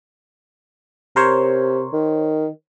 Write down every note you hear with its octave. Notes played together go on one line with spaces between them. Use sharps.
C3 A#4 C5 C#5
D#3